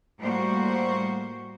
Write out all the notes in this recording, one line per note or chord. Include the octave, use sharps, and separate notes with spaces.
A2 G3 A#3 F#4 C5